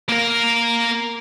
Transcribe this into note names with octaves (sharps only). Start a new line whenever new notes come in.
A#3 A#4